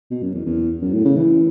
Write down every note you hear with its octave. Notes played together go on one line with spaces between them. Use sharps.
B2
F#2
E2
E2
F#2
A2
C#3
E3